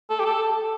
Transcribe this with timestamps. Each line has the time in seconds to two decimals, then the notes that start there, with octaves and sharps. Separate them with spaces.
0.10 A4
0.20 G4
0.25 A4